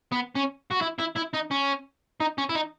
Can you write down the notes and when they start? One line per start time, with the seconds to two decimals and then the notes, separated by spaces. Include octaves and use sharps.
0.13 B3
0.36 C#4
0.72 F#4
0.82 E4
1.00 E4
1.17 E4
1.34 D#4
1.51 C#4
2.21 D#4
2.38 C#4
2.50 E4
2.55 D#4